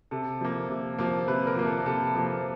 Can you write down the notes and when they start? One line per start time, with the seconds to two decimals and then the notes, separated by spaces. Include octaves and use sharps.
0.11 C3 A4
0.41 F3 A#3
0.69 C3
0.98 F3 A#3
1.28 C3 B4
1.47 A#4
1.56 F3 A#3
1.67 A4
1.86 C3 A4
2.15 F3 A#3